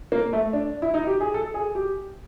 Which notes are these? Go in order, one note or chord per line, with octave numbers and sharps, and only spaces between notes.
A#3
A3
D4
E4
D#4
G4
G#4
A4
G#4
G4